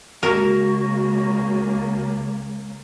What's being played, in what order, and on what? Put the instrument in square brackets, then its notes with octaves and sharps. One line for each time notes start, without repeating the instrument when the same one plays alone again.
[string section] C#2 C#3 A#3 [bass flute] G#3 [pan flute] F#4 [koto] A#4